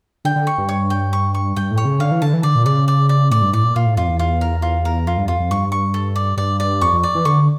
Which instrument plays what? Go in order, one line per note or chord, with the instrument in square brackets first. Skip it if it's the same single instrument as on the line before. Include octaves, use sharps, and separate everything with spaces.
[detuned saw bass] D3 [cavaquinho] G5
[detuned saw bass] D3
[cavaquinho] C#6
[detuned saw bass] G2
[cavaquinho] C#5
G5
C#6
C#6
[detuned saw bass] G2 [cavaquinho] G5
[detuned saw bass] A2
[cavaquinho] C#5
[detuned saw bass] C#3
[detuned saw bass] D3 [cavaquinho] F5
[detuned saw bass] E3
[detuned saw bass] D3 [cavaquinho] A5
[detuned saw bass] E3
[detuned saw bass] D3 [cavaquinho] D5
[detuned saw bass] A#2
[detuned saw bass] C#3 [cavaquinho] D5
[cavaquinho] D5
D5
[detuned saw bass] A2 [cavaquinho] D5
[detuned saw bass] G2
[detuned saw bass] A2 [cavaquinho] D5
[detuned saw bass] A#2
[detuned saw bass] A#2 [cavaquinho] F4
[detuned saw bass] A2
[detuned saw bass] F2 [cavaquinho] F4
[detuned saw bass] E2
[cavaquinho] F4
A#4
F4
A#4
[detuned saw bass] F2 [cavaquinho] F4
[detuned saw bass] G2
[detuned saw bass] F2 [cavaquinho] F4
[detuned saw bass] F2
[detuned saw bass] G2 [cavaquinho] C#6
[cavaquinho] C#6
A4
D5
[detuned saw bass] G2 [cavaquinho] D5
[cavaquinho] D5
[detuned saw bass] F2 [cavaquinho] C#6
[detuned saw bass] F2
[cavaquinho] D5
[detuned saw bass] E3
[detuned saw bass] D3 [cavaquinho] C#6